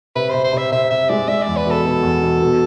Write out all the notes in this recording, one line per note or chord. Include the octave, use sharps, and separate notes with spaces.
C3 B4
C3 C5
C5
C3 E5
C3 E5
C3 E5
G#3 D5
G#3 E5
E2 D5
B4
B2 A4
B2
E2
B2
B2